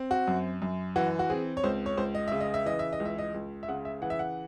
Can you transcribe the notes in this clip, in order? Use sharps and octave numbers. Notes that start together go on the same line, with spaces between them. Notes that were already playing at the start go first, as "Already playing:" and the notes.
Already playing: C4
F#4
F#2
F#2
E3 F#4
F#4
C4 G#4
C#5
C#2 C5
C#5
C#2 C5
D#5
C#3 E5
D#5
E5
E3 D#5
E5
D#5
C#2
E5
D#5
C#2
E5
C#3 F#5
E5
E3 F#5
E5
F#5